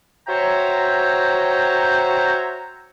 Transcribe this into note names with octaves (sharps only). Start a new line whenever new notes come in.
F#4 C5 C#5 E5 G5 A#5